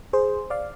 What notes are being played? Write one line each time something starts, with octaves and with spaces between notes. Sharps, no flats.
G#4 C5
D5 F5